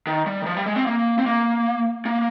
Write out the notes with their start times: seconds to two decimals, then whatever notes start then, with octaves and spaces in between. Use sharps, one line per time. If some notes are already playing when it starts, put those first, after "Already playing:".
0.07 D#3
0.26 G3
0.42 D#3
0.46 F3
0.57 G3
0.66 G#3
0.76 C4
0.87 A#3
1.19 C4
1.26 A#3
2.05 A#3